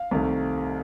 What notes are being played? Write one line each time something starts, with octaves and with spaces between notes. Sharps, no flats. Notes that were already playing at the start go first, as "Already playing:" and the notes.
Already playing: F5
C2 C3 D#3 A3